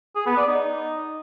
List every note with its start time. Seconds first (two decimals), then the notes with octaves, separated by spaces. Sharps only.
0.15 G#4
0.26 B3
0.37 D5
0.48 D#4